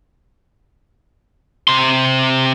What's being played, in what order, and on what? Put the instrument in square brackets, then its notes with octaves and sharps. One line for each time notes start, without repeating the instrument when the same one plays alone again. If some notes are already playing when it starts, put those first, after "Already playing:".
[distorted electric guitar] C3 C6